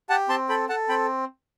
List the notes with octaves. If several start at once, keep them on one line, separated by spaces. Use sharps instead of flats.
G4 F#5 A5
C4 A5 C6
A4 G5 B5
A4 F#5 A5
C4 G5 B5